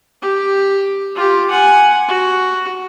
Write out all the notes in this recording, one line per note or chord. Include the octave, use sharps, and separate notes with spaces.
G4
F4 G4
F#5 G#5
F#4